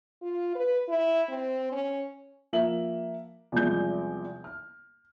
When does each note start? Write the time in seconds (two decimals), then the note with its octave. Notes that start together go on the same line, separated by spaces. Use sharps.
0.22 F4
0.55 B4
0.89 E4
1.29 C4
1.72 C#4
2.53 F3 A#3 F4 E5 F#7
3.52 E2 C3 F3 G3 G#3 G6
4.44 F6